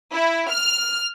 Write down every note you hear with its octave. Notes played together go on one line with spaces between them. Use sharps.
E4
F6